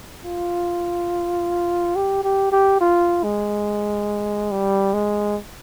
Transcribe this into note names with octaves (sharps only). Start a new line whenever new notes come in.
F4
G4
G4
G4
F4
G#3
G3
G#3